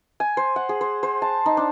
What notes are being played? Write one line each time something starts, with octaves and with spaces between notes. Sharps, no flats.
G#5
C5
F#5
G#4
C5
C5
A5
D#4
D4